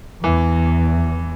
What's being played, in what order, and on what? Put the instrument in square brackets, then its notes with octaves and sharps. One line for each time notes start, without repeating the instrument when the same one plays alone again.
[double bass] E2 [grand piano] E3